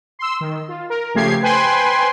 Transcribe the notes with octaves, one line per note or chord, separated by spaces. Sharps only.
C6 E6
D#3
F4
A#4
C#3 F3 A3 G4 G#6 C7
B4 C5 G5 G#5 B5 C6